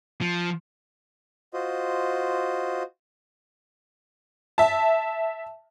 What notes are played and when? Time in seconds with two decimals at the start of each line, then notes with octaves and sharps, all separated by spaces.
0.21 F3
1.54 F4 F#4 C5 D#5
4.58 E5 A5